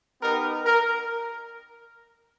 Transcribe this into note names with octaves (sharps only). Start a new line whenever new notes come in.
B3 D#4 G4 A#4
A#4